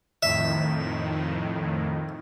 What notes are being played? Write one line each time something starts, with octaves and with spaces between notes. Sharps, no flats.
F2 A2 D#3 E5